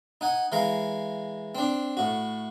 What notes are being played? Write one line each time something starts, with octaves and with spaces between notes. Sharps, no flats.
D#4 F#5 G#5
E3 G#3 F5 A#5
C4 D4
A2 F#4